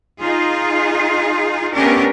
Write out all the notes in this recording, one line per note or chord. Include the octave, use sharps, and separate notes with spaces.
D#4 F4 G#4
A3 B3 C#4 D4 G4 A#4